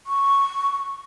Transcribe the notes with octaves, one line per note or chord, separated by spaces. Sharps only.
C#6